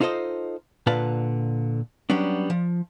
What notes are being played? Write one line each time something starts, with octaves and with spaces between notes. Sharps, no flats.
D#4 F4 A4 C5 D#5
A#2 D3 F4 B4 F5 A5
F#3 G3 B3 C#4 D4
F3